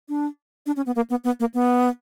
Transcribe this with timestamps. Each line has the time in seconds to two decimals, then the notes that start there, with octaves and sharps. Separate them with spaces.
0.09 D4
0.66 D4
0.76 C#4
0.86 B3
0.96 A#3
1.10 B3
1.24 B3
1.40 A#3
1.54 B3